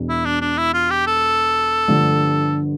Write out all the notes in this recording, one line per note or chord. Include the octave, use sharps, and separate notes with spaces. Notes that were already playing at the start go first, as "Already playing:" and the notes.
Already playing: E1 B2
E4
D4
D4
E4
F4
G4
A4
G1 G2 D3 F3 A3